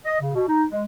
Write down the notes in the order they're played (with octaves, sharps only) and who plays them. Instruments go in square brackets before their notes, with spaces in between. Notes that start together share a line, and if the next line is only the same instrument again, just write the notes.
[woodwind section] D#5
C#3
B2
D#4
G#3